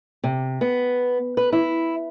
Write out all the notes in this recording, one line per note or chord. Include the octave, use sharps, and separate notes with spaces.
C3
B3
B4
E4